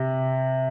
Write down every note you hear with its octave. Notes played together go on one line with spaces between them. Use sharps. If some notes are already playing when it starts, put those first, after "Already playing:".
Already playing: C3